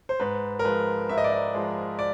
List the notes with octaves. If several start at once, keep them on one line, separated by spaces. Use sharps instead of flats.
C5
G#2 B4
A#4
F3 G#3 B4
G#2 E5
D#5
D5
D#5
F3 G#3
D5